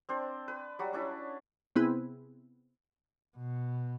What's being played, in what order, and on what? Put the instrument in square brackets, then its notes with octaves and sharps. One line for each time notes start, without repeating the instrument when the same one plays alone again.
[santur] C4 D4 C5
B4
F#3 G3 F#4
C#4 D4 E4
[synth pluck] C3 B3 C4 E4 G#4
[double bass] B2